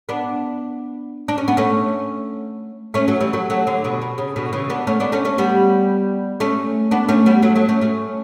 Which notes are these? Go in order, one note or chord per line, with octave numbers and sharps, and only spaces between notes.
B3 D4
D4
C#4
B3
A3 C#4
A3 C#4
F#3 A3
E3 G3
F#3 A3
F#3 A3
D3 F#3
B2 D3
B2
C#3
B2 D3
C#3 E3
B3 D4
A3 C#4
B3 D4
A3 C#4
A3 C#4
G3 B3
A3 C#4
B3 D4
A3 C#4
G3 B3
F#3 A3
F#3 A3
A3 C#4
A3 C#4